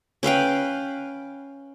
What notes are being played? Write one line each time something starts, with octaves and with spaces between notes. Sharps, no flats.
C#4 B4 F5 G5